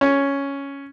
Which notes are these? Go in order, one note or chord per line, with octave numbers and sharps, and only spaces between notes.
C#4